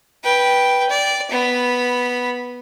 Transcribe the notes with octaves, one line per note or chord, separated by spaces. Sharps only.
B4 G5
D5
B3 B5